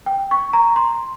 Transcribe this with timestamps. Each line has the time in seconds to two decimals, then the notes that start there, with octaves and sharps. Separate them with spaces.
0.06 G5
0.31 C#6
0.53 A#5
0.76 C6